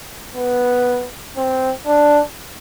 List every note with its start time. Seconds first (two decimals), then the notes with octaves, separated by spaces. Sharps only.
0.36 B3
1.37 C4
1.87 D4